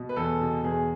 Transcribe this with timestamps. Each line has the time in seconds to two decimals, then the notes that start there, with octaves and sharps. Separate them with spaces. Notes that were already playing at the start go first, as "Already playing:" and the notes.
Already playing: B2
0.09 B4
0.16 E2 A4
0.41 B2
0.64 E2 G#4